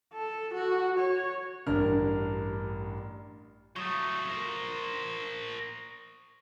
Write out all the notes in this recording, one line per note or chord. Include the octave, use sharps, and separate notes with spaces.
A4
F#4
C#5
A1 G2 D4 A#4 F6
F#3 A3 C#6 D#6
A#4 C5